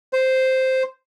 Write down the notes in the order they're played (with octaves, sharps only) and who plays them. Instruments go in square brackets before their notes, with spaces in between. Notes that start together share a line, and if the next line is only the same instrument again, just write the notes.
[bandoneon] C5